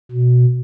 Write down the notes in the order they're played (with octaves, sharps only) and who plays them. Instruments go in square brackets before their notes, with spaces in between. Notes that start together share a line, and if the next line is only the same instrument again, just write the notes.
[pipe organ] B2